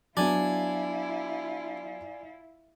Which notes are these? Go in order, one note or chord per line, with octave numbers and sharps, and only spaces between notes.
F#3 B3 D4 E4 F4 D5 G#5